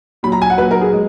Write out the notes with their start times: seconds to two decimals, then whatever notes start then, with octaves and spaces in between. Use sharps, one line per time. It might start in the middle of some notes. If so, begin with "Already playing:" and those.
0.23 A#2 F#3 B5
0.32 A#5
0.42 G#5
0.50 F#5
0.58 A#2 F#3 B4
0.71 A#4
0.81 G#4
0.93 G#3